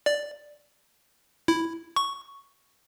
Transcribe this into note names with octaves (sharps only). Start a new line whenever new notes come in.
D5
E4
C#6